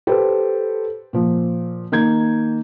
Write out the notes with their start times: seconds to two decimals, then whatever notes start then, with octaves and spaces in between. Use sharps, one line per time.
0.07 G4 A4 B4 C5
1.13 A#2 F3
1.92 D#3 A#3 G6 G#6